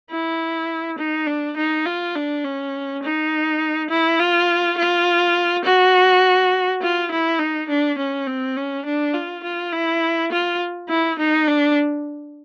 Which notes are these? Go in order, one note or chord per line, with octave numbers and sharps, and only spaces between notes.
E4
D#4
D4
D#4
F4
D4
C#4
D#4
E4
F4
F4
F#4
F4
E4
D#4
D4
C#4
C4
C#4
D4
F4
F4
E4
F4
E4
D#4
D4